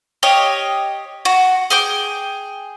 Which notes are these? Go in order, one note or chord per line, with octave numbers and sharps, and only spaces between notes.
G4 C#5 D#5 F5
F#4
G#4 G5 D6